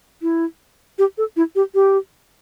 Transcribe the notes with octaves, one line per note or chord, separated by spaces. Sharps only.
E4
G4
A4
E4
G4
G4